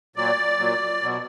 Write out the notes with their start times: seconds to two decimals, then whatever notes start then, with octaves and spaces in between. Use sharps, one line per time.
0.16 A#2 F#3 D5
0.59 A#2 F#3
1.02 B2 F#3